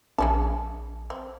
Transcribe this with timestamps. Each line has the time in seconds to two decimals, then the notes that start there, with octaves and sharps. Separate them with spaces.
0.18 A#1 G#3 C#4 A5
1.10 C4